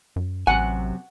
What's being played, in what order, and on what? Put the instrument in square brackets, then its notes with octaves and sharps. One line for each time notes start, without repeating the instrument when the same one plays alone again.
[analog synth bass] F#2
[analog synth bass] A1 [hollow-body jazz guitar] F#2 C3 G#5 [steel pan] F#5